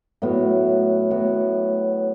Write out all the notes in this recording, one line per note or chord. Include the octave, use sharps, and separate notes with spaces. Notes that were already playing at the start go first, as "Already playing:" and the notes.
A2 F#3 B3 F#4
A2 F#3 B3 F#4